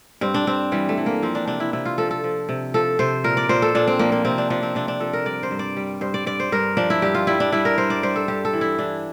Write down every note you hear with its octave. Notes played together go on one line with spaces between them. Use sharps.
G2 C4
D4
G2 C4
E3 G3
A3
E3
A#3
F3 C4
D4
C3 D4
E4
C3 E4
F4
F3 A4
A4
F3
C3
F3 A4
C3 C5
A#2 A#4
D5
A#2 C5
A4
A#2 D4
C4
F3 A#3
A#3
C3 C4
D4
F3 D4
C4
C3 D4
D4
F3 A4
A#4
G2 D5
C5
G2
D5
G3
G2 C5
D5
G2 D5
C5
G2 A#4
F3 D4
E4
G2 G4
F4
G3 E4
D4
G3 E4
A#4
G3 C5
D5
G3 C5
A4
G2 G4
A4
E3
E4
E3 D4